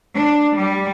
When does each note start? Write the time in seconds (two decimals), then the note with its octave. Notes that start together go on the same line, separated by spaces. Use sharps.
0.15 D4
0.56 G3